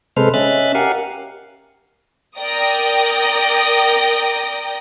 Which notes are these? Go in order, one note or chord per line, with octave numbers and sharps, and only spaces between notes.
C3 G#3 A4 B4 C5 F6
C#4 D#5 E5 F#6 A6
G4 A#4 F5 F#5 G#5
A#4 D5 G5 D#6 A#6